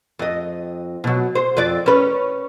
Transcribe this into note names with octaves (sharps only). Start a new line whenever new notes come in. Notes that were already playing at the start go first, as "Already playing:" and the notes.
F2 D#5
B2 F#3
C5
F2 D5
C#4 B4